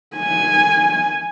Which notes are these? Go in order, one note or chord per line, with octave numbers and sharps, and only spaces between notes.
G#5